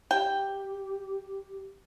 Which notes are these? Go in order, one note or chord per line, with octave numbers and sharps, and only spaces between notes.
G4 G5